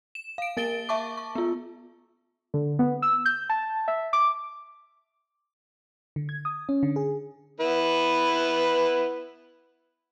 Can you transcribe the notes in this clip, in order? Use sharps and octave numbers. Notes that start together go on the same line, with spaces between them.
E7
F5 D7
A#3 A#4 A6 D7 G7
E5 A5 C#6 D6
C#6
B3 F4
D3
B3
E6
G6
A5
E5
D6
D3
G#6
D#6
C#4
D3
G#4
B3 E4 B4